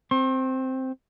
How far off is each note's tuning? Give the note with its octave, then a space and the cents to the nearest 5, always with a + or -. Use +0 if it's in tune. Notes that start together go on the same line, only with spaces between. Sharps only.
C4 +0 C6 +45